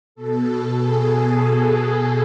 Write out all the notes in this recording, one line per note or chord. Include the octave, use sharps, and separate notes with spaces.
B2 A4
G#4
A4